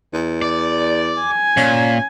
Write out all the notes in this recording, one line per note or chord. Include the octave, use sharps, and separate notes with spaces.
E2
D5
G#5
A#2 C#4